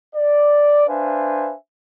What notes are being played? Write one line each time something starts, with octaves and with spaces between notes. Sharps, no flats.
D5
D4 B4 C5 E5 F5 G#5